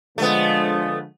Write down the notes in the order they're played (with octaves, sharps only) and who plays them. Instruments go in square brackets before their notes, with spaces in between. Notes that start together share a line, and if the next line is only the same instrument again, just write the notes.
[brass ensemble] D3 F3 G#3 [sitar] A3 B3